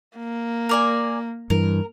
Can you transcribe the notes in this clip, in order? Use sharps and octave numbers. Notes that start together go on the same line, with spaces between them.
A#3
A#4 D5 G#5
G2 E3 A#4